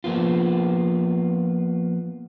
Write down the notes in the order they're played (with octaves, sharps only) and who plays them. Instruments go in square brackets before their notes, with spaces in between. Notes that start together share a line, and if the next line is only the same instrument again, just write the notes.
[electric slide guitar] F3 A#3 B3 F4